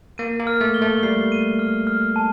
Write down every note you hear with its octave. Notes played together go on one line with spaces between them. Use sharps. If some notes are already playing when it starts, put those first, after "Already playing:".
A#3 D#7
A#3
F6
A3
G7
A3
G3 C7
D#7
F6
F6
A5